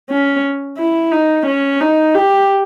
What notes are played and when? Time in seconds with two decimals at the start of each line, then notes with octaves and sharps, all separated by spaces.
0.10 C#4
0.78 E4
1.12 D#4
1.47 C#4
1.81 D#4
2.14 G4